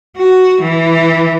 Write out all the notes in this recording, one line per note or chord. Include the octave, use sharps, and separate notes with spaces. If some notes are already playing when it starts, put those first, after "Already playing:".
F#4
E3